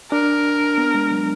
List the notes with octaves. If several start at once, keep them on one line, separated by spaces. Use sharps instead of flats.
D4 A#4
B3
G#3
F#3